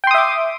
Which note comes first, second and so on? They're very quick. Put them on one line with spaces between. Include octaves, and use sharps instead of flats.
G5 C6 D#6 E5 D6